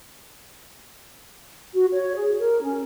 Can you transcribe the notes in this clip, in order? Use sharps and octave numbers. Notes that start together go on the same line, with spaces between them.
F#4
C#5
G#4
A#4
C#4